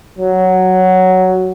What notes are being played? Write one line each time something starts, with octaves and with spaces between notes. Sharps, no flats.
F#3